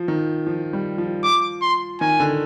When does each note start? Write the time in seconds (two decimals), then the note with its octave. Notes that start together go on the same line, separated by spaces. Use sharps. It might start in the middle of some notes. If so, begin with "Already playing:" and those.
Already playing: F3
0.08 D#3
0.47 F3
0.73 G3
0.98 F3
1.24 D6
1.62 C6
2.01 D#3 G#5
2.20 D3